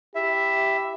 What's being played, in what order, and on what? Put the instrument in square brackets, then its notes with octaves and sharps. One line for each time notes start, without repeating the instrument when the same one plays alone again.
[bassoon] E4 [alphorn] G4 [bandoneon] E5